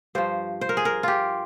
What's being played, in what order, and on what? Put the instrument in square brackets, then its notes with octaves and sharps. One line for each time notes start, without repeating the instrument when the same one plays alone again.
[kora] G2 F3 C5
C5
A#4
G#4
A#4
F4 G4